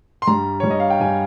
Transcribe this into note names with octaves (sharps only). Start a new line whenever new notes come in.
C6
G2 G3 A#5
G2 G3 C#5
D#5
F5
G5
G2 G3 G#5